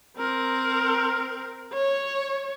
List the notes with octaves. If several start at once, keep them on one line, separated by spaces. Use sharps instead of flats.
C4 A#4
C#5